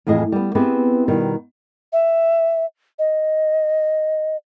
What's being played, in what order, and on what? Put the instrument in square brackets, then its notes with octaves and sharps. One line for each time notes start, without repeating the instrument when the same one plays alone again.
[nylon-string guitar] F2 A2 E3 G#4 D#5
G3 B3
B3 C4 E4 G4 G#4 B4
B2 D#3 G3
[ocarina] E5
D#5